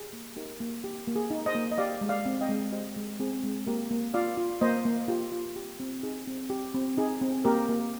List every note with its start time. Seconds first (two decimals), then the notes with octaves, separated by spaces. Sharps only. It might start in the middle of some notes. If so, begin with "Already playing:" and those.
Already playing: G4 G#4
0.13 A#3
0.36 D#4 G4 A#4
0.60 A#3
0.84 G4
1.07 A#3
1.16 G#4
1.30 D#4
1.46 C5 D#5
1.55 A#3
1.72 D#5
1.78 G4 D5 F5
2.01 G#3
2.09 D5 F5
2.26 C4
2.41 D#5 G5
2.49 G#3
2.72 G4 C5 D#5
2.96 G#3
3.20 C4 G#4
3.44 G#3
3.66 A#3 G4 A#4
3.91 A#3
4.14 F4 D5 F5
4.38 F4
4.61 A#3 C5 D#5
4.85 A#3
5.08 F4 G4
5.32 F4
5.56 G4
5.80 C4
6.03 D#4 G#4
6.27 C4
6.50 G4
6.75 C4
6.97 D#4 G#4
7.21 C4
7.45 A#3 G4 A#4
7.69 A#3